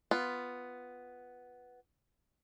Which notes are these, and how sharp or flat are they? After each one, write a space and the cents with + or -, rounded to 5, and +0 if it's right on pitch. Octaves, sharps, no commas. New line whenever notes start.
B3 +5 F4 +0